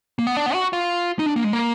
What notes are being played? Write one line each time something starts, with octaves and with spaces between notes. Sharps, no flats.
A#3
B3
D4
B3
F#4
F4
D#4
D4
A#3
G#3
A#3